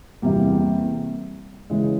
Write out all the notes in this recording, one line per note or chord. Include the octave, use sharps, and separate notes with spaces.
E2 C3 G3 A#3
C#3 E3 G#3